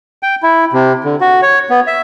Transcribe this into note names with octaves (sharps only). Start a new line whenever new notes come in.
G5
E4
C3
D3
F#4
C#5
B3
E5